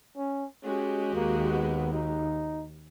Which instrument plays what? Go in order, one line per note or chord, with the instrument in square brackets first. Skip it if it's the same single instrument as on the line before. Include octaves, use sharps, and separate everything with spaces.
[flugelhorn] C#4
[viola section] G#3 F#4 G4 [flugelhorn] C#4
[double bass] D#2 [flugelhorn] A#3
[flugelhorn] B3
D#4